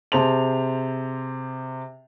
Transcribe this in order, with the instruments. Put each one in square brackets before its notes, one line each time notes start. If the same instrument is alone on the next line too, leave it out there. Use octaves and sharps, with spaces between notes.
[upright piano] C3 G#4 C5 A5 C6 F7